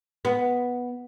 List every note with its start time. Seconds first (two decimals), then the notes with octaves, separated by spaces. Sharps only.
0.25 B3